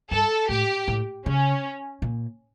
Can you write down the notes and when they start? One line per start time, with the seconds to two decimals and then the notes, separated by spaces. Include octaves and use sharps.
0.11 G2 A4
0.49 A2 G4
0.88 A2
1.26 C#3 C#4
2.02 A#2